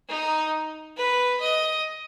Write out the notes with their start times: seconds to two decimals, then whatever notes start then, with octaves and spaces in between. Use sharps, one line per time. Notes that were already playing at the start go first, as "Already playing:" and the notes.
0.09 D#4
0.97 B4
1.41 D#5